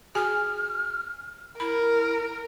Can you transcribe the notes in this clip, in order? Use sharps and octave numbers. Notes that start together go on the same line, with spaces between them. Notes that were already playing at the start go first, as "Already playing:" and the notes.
F#4 G#4 G#5 F6
E4 A#4 B5